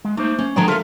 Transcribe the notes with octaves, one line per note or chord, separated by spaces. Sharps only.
G#3
A3 A#3 D#4 C5
C#4
D3 F3 G#3 C#5 G5 A#5
F4 A4 A#4 E5 F5